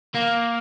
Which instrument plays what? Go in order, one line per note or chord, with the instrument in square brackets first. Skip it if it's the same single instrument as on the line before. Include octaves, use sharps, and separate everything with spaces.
[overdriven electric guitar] A#3